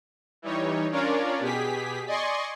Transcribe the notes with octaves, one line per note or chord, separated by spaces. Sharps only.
E3 G3 D#4 C#5
C#4 D4 F4 A#4 C#5 D5
B2 G4 G#4 B6
D5 D#5 G#5 C6 C#6